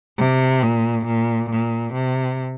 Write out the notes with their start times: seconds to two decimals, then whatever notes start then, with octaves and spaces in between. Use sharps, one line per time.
0.18 C3
0.63 A#2
1.07 A#2
1.51 A#2
1.94 C3